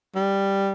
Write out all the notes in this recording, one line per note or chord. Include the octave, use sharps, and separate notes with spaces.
G3